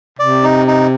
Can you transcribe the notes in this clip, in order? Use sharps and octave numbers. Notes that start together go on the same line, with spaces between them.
C3 D5
D#4
D#4